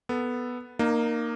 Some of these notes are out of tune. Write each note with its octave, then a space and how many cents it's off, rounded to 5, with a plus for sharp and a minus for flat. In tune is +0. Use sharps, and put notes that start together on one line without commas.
B3 +0 A4 +0
A#3 +0 D#4 -30